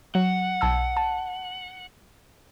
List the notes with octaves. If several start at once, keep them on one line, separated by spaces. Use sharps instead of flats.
F#3 F#5
B1 A5 E6
A5